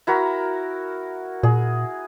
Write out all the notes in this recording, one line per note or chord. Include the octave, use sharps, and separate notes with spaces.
E4 F#4 A#4
A#2 G#4